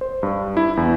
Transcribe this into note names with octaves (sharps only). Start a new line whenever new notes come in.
C5
G2
E4
E2